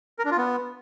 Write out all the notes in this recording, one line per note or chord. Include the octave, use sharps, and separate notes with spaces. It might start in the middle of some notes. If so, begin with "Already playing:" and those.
A#4
D4
F4
B3